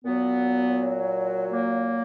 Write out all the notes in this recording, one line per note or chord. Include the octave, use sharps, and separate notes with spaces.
A#2 F#3 B3
A#3